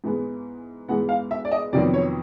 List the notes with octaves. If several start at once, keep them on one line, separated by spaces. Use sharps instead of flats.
G#2 E3 G#3 B3
G#2 E3 G#3 B3 F#5
F5
E5
D5
D#5
F2 C3 D#3 F#3 B3 D5
C#5